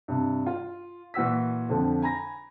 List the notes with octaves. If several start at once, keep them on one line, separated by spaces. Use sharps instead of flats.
G2 C3
F4
A#2 E3 F#4 E6 B6
F2 D3 F3
G#5 A#5 B5 A#6